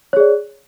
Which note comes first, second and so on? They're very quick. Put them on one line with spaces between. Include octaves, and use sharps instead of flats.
C#5 G#4 D5